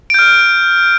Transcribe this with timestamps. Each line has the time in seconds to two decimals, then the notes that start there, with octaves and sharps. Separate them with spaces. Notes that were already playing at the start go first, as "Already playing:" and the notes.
0.10 D7
0.14 G6
0.19 F6